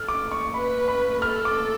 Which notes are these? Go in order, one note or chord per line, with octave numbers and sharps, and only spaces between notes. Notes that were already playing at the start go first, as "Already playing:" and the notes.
Already playing: A4 F6
D6
C#6
B4 B5
B5
A4 F6
D6